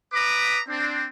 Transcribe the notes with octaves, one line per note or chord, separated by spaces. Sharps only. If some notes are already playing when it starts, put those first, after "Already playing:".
B4 A#5 B5 D6 D#6
C4 D4